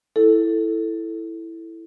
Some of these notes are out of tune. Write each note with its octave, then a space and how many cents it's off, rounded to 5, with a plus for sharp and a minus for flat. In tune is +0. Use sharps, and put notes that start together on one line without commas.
E4 +0 A4 +0